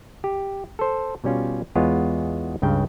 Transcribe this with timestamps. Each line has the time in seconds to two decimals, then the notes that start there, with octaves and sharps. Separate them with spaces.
0.24 G4
0.79 A4 C5
1.24 B2 G3 C#4 F4
1.75 E2 G#3 B3 F4 C#5
2.62 C#2 G2 C#3 G5